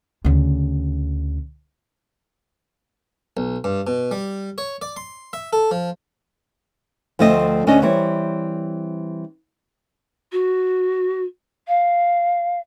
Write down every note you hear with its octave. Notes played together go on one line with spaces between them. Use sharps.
D2 C#3
B1
G2
B2
G3
C#5
D5
C6
E5
A4
F3
D2 F3 A3 C4 D#5
D2 C#4 D4 D#5
E3 G3 C4 C#5
F#4
F5